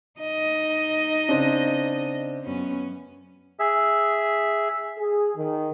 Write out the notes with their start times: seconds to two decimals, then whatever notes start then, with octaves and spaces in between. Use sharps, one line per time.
0.20 D#4 D#5
1.29 C#3 C4 D4
2.43 F#2 B3 C#4
3.60 G#4 E5
4.98 G#4
5.36 D#3